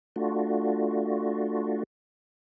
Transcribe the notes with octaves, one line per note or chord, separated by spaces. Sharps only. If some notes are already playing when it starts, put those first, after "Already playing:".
A3 D4 F4 F#4